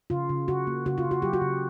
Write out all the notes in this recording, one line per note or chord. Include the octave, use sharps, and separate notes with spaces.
C#3 F4
C#3
C#3 F#4
A#3
C#3 F#4
F4
C#3
F#4
F#3 G4
F#4
C#3